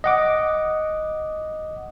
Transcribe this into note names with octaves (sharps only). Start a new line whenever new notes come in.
D#5 F#5 D6